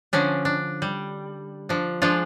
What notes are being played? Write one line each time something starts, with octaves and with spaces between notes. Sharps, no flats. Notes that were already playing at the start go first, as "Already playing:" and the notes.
D3 F3 C#4 D4
D4
G3
F3 D4
F3 G#3 D4 F4